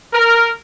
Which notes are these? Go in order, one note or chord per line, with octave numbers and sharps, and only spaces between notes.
A#4